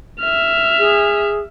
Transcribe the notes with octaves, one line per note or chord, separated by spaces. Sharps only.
E5 F6
G#4